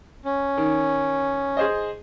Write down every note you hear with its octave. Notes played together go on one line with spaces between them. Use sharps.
C#4
D#3
G#4 C5 D#5